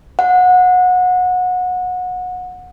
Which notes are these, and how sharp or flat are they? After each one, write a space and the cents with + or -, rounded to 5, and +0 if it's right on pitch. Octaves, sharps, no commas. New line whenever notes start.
F#5 -25